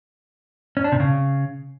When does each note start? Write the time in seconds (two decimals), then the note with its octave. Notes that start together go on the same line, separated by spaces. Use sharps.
0.77 C#4
0.84 D4
0.92 C3
1.00 C#3